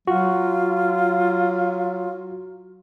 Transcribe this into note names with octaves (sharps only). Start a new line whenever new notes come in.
F#3 F4 F#4